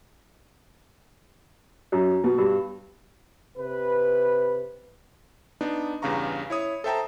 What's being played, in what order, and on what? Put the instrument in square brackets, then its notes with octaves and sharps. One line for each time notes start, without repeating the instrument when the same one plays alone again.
[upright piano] F#2
B2
G2
[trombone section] C3 B4
[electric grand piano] B3 D4 D#4
E2 G2 C#3 F5 A#5 C#6
E4 C#5 D#6
A4 C5 E5 G5 A5 A#5